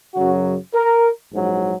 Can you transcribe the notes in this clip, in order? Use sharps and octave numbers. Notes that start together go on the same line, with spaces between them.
F#2 C#3 F#3 F#4
A#4
A#1 G#2 F#3